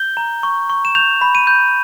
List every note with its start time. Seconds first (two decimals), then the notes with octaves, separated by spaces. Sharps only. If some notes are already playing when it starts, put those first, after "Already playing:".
Already playing: G6 G7
0.17 A#5
0.43 C#6
0.70 C#6
0.85 E7
0.95 G6 F7
1.21 B5
1.35 D#7
1.47 G6